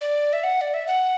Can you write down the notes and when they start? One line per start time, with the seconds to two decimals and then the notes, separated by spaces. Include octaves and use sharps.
0.01 D5
0.33 E5
0.44 F#5
0.61 D5
0.74 E5
0.87 F#5